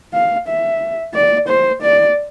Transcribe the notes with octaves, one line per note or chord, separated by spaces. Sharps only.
F5
E5
D5
C5
D5